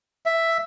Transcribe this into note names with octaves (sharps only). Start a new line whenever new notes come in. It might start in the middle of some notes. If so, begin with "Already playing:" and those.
E5